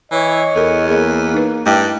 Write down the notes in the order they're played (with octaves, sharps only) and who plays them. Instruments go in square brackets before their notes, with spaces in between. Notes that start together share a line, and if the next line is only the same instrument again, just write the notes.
[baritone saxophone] E3 [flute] C#5 [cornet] D#5
[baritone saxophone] E2 [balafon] A4 A#4
[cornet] A#3 [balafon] G#4 A#4 D#5
[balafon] D#4 B4
[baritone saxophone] G2 [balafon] A3 E4 D#5 [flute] G5